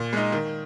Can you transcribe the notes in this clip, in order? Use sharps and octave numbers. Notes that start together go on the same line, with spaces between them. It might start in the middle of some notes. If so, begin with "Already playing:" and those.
Already playing: A#2
G#3 D#4
D#3